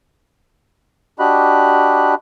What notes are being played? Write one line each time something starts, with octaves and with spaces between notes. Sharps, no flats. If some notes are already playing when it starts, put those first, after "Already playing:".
D4 F#4 G4 D#5 B5 F#6